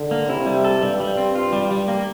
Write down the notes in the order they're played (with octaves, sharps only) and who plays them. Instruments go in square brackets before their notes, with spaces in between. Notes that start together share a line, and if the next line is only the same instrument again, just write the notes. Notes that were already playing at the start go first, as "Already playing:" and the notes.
Already playing: [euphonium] D3
[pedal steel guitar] A#3
[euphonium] C3 [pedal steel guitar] E4
[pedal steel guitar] G3
A4
[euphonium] G2 [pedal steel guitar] G3
[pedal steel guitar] G3
C4
F4
G3
G3
A#3